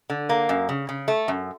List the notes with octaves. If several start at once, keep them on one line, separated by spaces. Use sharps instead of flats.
D3
A#3
F#2
C#3
C#3
A3
F#2